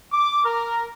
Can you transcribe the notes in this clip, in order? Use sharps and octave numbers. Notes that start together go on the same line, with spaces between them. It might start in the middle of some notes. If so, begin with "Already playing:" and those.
D6
A#4